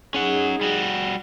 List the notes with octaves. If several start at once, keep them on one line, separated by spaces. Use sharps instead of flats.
C#4 D#4 G#4 F#5
G3 F#4